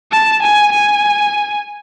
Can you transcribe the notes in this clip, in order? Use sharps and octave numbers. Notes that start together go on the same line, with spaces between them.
A5
G#5
G#5